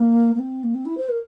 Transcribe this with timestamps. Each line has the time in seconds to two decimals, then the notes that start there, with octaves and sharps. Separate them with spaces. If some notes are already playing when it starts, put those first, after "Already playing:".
Already playing: A#3
0.35 A#3
0.39 C4
0.63 A#3
0.74 C4
0.85 E4
0.97 C5
1.09 A#4